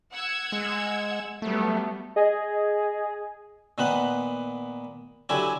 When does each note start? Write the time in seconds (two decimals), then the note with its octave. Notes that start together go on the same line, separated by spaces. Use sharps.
0.13 F#5 E6 G#6
0.52 G#3
1.42 F#3 G3 A3 B3
2.16 G#4 D#5
3.78 A#2 D#3 B3 B4 F#5
5.29 D3 F#3 E4 G4 G#5